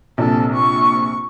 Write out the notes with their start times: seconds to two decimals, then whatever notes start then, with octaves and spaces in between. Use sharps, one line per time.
0.18 A#1 C3 A4
0.54 C#6